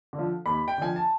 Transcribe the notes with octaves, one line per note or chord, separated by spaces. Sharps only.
D3
F3
D#2 B5
G5
D3 F3 G#5
A5